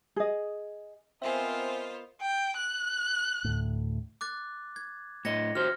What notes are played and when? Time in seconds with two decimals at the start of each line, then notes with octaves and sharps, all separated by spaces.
0.16 G#4 D#5
1.22 B3 C4 F4 A#4 C5 D#5 E5 G#5
2.21 G5
2.56 F#6
3.44 D2 A2
4.21 D6 F#6 A6
4.76 G#6
5.25 A2 D#5 G#6 A#6 C#7
5.55 F#4 G4 C5 F6